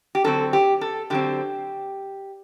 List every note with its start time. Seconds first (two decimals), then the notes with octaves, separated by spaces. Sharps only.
0.15 G4
0.24 D3 F#3 C4 A4
0.53 G4
0.81 A4
1.10 D3 F#3 C4 G4